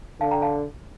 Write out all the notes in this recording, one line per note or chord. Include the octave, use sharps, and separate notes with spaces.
D3 F5 A5
G5 A#5
F5 A5